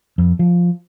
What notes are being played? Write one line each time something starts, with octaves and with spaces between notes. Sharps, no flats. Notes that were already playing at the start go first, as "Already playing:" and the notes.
F2
F3